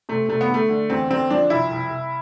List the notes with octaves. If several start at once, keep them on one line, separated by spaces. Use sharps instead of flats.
C3 A3
C3 A3
B3
D3 A3
D3
E2 C4
D3 C4
F3 D4
C2 E4
C2
C2